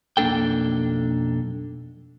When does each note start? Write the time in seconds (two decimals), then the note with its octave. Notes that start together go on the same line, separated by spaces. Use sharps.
0.17 B1 F2 A#3 D4 A4 G5